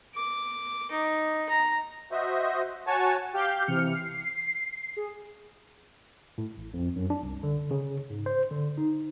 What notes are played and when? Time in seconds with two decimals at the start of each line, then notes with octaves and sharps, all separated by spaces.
0.15 D6
0.91 D#4
1.49 A#5
2.11 F#4 C5 D#5 E5
2.87 F#4 C#5 G#5 A5 C#6
3.33 G4 F5 G6
3.67 C3 E3 F6 C#7
3.94 C7
4.96 G#4
6.38 A2
6.57 A1
6.74 F2
6.96 F#2
7.10 D4
7.23 C2
7.43 D3
7.71 C#3
8.10 G#2
8.26 C5
8.51 D3
8.78 D#4